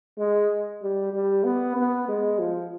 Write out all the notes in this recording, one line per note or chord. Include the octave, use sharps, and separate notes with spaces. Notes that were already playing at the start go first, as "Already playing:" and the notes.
G#3
G3
G3
B3
B3
G#3
F3